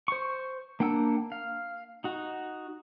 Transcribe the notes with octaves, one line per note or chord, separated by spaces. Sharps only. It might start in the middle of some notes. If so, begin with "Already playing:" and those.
C5 C#6
A#3 D4 F#5 G5 E6
F5
D#4 F#4